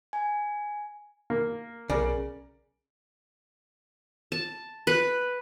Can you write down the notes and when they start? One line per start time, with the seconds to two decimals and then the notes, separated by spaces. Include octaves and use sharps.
0.13 G#5
1.30 A#3
1.90 B1 C#3 A#4 D5
4.32 A5
4.87 B4